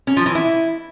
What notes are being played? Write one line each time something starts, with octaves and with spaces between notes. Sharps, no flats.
C#4
F3
E3
E4